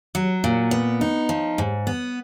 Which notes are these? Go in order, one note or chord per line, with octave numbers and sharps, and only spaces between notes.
F#3
A#2
B3
D#4
F3
G#2
B3